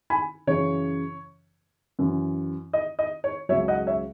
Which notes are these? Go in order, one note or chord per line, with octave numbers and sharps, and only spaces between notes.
G#5 B5
F#2 C#3 E3 C#5
F#2 E3
D#5
D#5
C#5
C#2 C#3 F#3 C#5 E5
D#5 F#5
C#5 E5